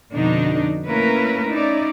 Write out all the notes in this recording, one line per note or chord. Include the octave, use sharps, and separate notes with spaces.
F2 B2 D3 D4 D#4
A3 A#3 C#4 E4 A#4 B4
C#4 D#4 E4 D5